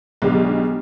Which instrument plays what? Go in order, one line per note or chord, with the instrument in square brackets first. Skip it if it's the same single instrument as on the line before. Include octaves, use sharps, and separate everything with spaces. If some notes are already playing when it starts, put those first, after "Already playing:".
[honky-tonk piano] B1 D3 G#3 D4 G4